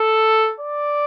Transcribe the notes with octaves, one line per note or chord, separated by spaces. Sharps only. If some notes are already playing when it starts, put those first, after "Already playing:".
Already playing: A4
D5